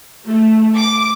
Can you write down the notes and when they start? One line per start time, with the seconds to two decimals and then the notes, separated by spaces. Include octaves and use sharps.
0.26 A3
0.76 D6